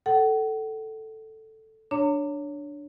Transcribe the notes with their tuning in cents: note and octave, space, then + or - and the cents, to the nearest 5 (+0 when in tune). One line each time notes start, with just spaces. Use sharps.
A4 +0 F#5 +40
D4 +0 C#5 +10 A#5 -40